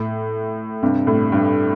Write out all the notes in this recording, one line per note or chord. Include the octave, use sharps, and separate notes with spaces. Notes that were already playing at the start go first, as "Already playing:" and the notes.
Already playing: A2
G2 C3
A2
G2